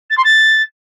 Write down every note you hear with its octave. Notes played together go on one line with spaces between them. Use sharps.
A6
C6
A6